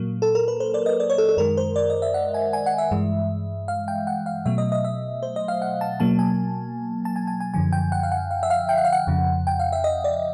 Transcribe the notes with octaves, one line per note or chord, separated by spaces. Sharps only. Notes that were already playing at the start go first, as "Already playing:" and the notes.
Already playing: A#2 F#3 A#3
A4
A#4
B4
C5
D5
D#5
D5
C#5
A4
A4
F#2 D#3 G#3 A#4
C5
D5
D#5
E5
F#5
G#5
G#5
F#5
E5
G2 E3 G#3
F5
G5
F#5
F5
B2 F#3 A3 E5
D#5
D#5
E5
C5
D#5
F5
F#5
A5
B2 F#3 A#3 A5
G#5
A5
G#5
G#5
G#5
F#2 D3 F3 G#5
G5
F#5
F5
F#5
F5
E5
F5
G5
F#5
F5
F#5
F2 C#3 F3
G5
F5
E5
D#5
D5